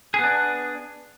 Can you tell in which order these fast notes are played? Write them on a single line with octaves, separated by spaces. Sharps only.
G#4 B3 D4